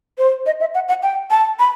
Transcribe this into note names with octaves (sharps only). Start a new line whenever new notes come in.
C5
D#5
E5
F#5
F#5
G5
A5
B5